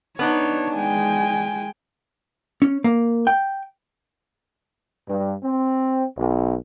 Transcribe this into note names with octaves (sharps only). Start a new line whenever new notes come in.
B3 D4 D#4 C#5
G#3 G5 G#5
C#4
A#3
G5
G2
C4
B1